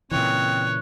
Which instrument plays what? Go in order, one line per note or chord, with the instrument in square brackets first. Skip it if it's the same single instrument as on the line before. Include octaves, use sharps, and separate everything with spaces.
[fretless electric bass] A#2 C#3 E3 [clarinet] C4 [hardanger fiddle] C#5 [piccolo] F#6